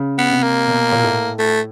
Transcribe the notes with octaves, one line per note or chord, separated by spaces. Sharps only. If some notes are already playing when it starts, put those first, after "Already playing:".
Already playing: C#3
B3
C3
A#3
B2
A#2
A2
A3